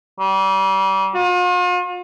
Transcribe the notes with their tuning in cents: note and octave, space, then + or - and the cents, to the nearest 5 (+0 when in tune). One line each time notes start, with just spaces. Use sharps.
G3 -30
F4 +45